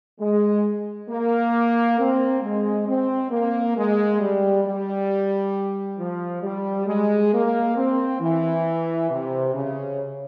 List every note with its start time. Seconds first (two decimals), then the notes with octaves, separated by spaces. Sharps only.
0.20 G#3
1.09 A#3
1.99 C4
2.42 G#3
2.88 C4
3.31 A#3
3.76 G#3
4.20 G3
4.64 G3
5.99 F3
6.43 G3
6.87 G#3
7.33 A#3
7.76 C4
8.21 E3
9.11 C3
9.54 C#3